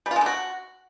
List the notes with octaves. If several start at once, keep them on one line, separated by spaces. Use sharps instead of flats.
G3
F4
G#3
D3
F#4